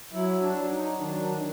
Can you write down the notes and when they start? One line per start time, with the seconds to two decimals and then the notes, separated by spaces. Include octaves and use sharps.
0.12 F#3 E4
0.41 D4
0.56 F#3
0.70 D#4
0.95 D#4
0.99 D#3 D4